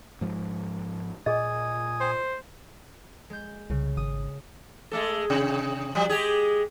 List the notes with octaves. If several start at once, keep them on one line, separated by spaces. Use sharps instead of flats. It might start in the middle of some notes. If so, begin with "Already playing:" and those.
G#2 F3 G#3
A#2 G#4 D#5 G#5 D#6 G#6
C5
G#3 G6
C2 C#3
G#1 D#6
G#3 A3 A4
C3
F3 G3
G#3 G4 G#4